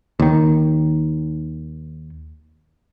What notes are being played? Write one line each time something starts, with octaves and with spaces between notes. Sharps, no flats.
D#2 D#3